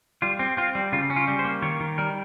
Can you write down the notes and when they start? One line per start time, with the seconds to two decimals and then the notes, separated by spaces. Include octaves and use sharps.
0.22 G3 F4
0.39 C4
0.57 C4 F4
0.75 G3
0.92 C#3 F4
1.10 C#4
1.16 F4
1.28 G3
1.39 C5
1.45 A#3
1.62 D#3 C#5
1.80 D#3
1.98 G3 A#4